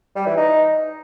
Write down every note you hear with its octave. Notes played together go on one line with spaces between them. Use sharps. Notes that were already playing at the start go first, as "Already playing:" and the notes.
G3
E3
D#4